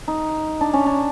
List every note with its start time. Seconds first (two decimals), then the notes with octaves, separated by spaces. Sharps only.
0.08 D#4
0.61 D4
0.73 C#4
0.86 D4